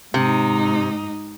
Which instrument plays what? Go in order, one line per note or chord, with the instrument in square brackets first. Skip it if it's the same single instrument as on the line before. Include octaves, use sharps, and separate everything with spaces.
[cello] G#2 D#4 [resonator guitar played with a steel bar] C3